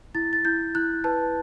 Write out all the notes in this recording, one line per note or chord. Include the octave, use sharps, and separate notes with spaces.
E4 A6
A6
E4 G6
E4 F#6
B4 A5